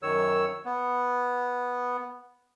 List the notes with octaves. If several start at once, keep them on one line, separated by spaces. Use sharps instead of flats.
F#2 D#3 C#5 E6
B3